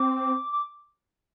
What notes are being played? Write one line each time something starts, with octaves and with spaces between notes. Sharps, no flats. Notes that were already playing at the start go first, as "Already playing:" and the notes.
Already playing: C4 D6
D6